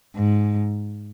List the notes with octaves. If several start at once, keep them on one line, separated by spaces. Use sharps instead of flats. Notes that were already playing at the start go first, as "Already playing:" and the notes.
G#2